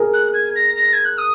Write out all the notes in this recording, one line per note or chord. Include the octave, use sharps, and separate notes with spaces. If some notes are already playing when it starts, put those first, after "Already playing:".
Already playing: G#4 A#4
F#6
G#6
A#6
A#6
G#6
F#6
D#6